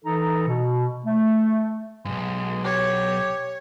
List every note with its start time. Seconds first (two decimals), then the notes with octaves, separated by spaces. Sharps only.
0.05 E3 D#4 A4 A#5
0.48 B2
1.06 A3
2.05 B1 G2 G#3
2.65 G4 C#5